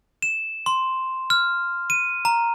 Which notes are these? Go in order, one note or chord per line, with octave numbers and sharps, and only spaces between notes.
E7
C6
F6
D#7
A#5